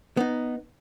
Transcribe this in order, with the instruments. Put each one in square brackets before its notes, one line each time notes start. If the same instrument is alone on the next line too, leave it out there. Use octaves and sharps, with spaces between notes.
[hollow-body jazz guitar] B3 D#4